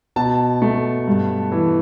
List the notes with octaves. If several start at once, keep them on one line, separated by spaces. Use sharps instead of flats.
B2 A5
A3
G2
E3